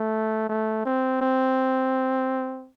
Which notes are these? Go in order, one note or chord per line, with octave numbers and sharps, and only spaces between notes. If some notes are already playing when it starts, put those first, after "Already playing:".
Already playing: A3
A3
C4
C4